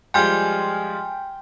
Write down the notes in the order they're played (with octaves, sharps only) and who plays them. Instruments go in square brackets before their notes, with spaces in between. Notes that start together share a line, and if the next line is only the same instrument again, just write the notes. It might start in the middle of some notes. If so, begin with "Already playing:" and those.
[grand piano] F3 G3 G#3 [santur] G5 [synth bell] G#5 C6 F6